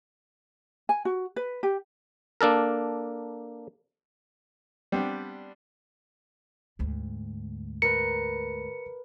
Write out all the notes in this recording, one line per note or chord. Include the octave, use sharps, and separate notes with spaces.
G#5
F#4
B4
G4
A#3 D4 A4 A#4
G3 B3 C4 D4
D2 G#2
A#4 B4 C#7